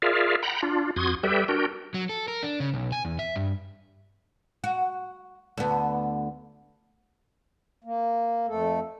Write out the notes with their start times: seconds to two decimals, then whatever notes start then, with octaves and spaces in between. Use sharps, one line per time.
0.02 F4 G#4 A#4 D5 E5 F5
0.43 F#5 G5 A#5 B5
0.63 D4 F4
0.96 F2 F#4 C6 D#6 G#6
1.23 G3 G4 A4 B4 E5 G5
1.48 D4 F#4 A#4 G5
1.94 F#3
2.09 A4
2.28 A#4
2.43 D4
2.60 C#3
2.74 B1
2.92 G#5
3.05 E2
3.19 E5
3.36 G2
4.64 F#4
5.57 D2 B3
7.84 A#3
8.48 F2 A3 A4